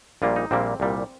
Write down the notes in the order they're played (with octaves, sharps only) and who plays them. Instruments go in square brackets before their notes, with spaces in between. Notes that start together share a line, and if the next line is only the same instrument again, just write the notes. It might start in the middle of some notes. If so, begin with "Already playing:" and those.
[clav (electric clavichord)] A#1 A#2 G3 A#3 F4
D#4
A#1 A#2 G3 A#3 C4
C2 A#2 G3